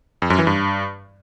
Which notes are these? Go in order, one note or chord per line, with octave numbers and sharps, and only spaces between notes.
F2
F#2
E3
G2